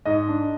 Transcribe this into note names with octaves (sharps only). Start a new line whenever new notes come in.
G#2 D#5
D4